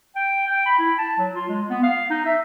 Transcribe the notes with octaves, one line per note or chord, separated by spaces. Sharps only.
G5
G5
B5
E4
A5
F#3
F4
G#3
B3
F5
D#4
E5